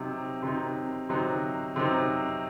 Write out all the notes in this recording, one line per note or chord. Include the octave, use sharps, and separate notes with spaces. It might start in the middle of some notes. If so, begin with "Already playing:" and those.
Already playing: C3 F#3 C4 D#4
C3 F#3 C4 D#4
C3 F#3 C4 D#4
C3 F#3 C4 D#4